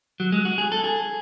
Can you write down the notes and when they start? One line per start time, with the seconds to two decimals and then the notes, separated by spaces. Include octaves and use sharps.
0.20 F#3
0.32 G#3
0.45 F#4
0.58 G#4
0.72 A4
0.84 G#4